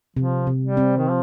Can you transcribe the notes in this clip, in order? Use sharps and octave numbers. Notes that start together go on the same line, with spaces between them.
C3 F3
C3
G3
C4
D#3
F3